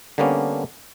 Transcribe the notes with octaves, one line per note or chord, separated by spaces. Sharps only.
D3 G3 A#3 B3 C#4 D4